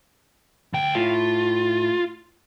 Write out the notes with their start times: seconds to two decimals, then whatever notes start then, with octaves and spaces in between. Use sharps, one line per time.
0.73 D2 G5
0.95 A2 F4